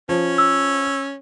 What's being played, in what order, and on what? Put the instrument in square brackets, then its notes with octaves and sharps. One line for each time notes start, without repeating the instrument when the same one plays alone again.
[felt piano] F3 [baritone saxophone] C#4
[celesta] E6